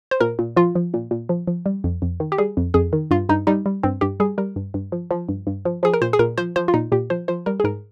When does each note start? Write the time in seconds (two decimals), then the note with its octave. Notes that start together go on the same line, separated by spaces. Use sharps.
0.11 C5
0.21 A#2 A#4
0.39 A#2
0.56 F3 F4
0.75 F3
0.94 A#2
1.11 A#2
1.29 F3
1.47 F3
1.66 G3
1.84 F2
2.02 F2
2.20 D#3
2.32 G4
2.38 G3 G#4
2.57 F2
2.74 F2 G#4
2.93 D#3
3.11 G2 F4
3.29 G2 D#4
3.47 G3 D#4
3.66 G3
3.83 G2 C4
4.01 G2 G4
4.20 G3 G#4
4.38 G3 A#4
4.56 G2
4.74 G2
4.92 F3
5.11 F3
5.29 G2
5.47 G2
5.65 F3
5.83 F3 G#4
5.94 A#4
6.02 A#2 C5
6.13 G#4
6.19 A#2 A#4
6.38 F3 C5
6.56 F3 C5
6.68 F4
6.74 A#2 D#4
6.92 A#2 G4
7.10 F3 C5
7.28 F3 C5
7.46 G3 A#4
7.60 G#4
7.64 G#2 A#4